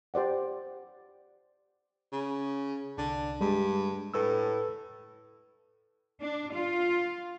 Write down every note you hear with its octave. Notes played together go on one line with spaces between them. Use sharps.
G4 C5 D5 F#5
C#3
C2 D3
G2 G3 G#3
A2 A4 B4 E6
D4
F4